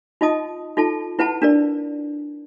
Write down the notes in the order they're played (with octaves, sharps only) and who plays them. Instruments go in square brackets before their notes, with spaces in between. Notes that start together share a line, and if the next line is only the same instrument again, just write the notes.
[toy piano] D#4 F4 D#5 A5 D#6
D#4 F4 A4 A5
E4 B4 F#5 A5
D4 A#4 D5